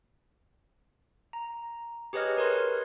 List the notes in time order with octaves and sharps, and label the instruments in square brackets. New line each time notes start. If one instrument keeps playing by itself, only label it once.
[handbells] A#5
G4 G#4 B4 C#5 D#5 F6
A#4 B4 C#5 C6